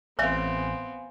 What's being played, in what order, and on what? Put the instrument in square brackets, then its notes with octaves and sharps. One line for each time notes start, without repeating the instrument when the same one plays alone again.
[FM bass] A1 [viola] B3 C4 [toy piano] C#5 E5 [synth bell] F5 G#5